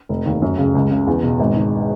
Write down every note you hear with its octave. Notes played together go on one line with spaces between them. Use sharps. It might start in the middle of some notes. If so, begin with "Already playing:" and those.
F1
D#2
F#2
C#3
C#2
C#3
E2
B2
G#1
G#2